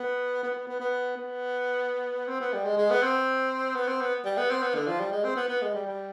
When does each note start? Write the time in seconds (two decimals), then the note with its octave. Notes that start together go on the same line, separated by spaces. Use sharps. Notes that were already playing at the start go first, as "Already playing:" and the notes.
Already playing: B3
0.43 B3
0.55 B3
0.68 B3
0.80 B3
1.16 B3
2.28 C4
2.40 B3
2.53 G3
2.65 G#3
2.77 G#3
2.90 B3
3.03 C4
3.75 B3
3.88 C4
4.01 B3
4.25 G3
4.37 B3
4.51 C4
4.62 B3
4.75 D3
4.87 F3
5.00 G3
5.12 G#3
5.24 C4
5.36 B3
5.48 B3
5.62 G#3
5.74 G3
5.86 G3